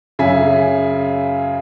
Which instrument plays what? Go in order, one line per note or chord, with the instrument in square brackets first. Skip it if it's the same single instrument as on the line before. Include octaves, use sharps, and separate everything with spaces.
[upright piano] F#2 C#3 E5 G#5 B6